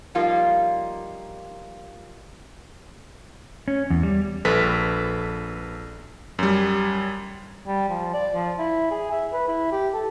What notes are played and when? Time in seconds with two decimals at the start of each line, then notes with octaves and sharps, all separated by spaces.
0.15 F3 G3 A#3 D#4 F4
3.68 C#4
3.90 E2
4.03 G3
4.45 A#1 A4 B4 B6
6.39 F#2 G3
7.67 G3
7.89 F3
8.14 D5
8.34 F3
8.58 E4
8.91 G#4
9.11 E5
9.33 B4
9.48 E4
9.72 G4
9.94 A4